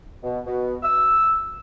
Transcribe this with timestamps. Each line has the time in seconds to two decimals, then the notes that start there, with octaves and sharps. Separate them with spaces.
0.23 B2
0.46 B2
0.83 E6